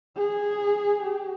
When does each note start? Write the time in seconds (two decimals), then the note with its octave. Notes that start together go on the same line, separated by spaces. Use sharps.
0.17 G#4
1.03 G4